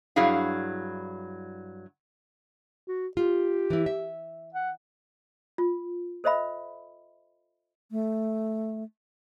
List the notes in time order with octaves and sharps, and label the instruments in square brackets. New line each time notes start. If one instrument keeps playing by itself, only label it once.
[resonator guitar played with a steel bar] G2 F#3 E4 G#4 F5
[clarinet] F#4
[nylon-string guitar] F4 [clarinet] G4
[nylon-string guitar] E3 E4
E5
[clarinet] F#5
[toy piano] F4
A4 C5 D#5 E5 B5
[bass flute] A3